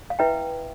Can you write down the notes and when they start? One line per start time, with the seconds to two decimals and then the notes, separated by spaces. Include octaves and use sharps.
0.10 F5
0.19 E4 B4 E5 G5